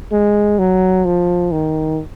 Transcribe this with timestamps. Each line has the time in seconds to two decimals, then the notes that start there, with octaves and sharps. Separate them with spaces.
0.12 G#3
0.59 F#3
1.05 F3
1.52 D#3